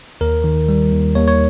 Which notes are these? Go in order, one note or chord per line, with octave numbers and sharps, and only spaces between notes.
D#2 A#4
D#3
G3
D#2
D#2 C#5
C#5